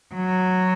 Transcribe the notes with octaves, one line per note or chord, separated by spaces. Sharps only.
F#3